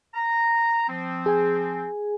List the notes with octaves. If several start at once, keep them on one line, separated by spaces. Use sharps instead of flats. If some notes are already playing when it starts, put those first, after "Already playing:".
A#5
F3 C4
G#4 G#5